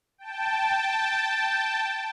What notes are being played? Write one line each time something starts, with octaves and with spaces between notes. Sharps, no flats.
G5 A5